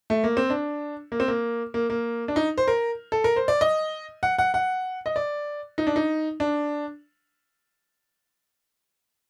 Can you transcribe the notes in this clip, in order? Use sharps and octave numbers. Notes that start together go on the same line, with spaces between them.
A3
A#3
C4
D4
A#3
C4
A#3
A#3
A#3
D4
D#4
C5
A#4
A4
A#4
C5
D5
D#5
F#5
F#5
F#5
D#5
D5
D#4
D4
D#4
D4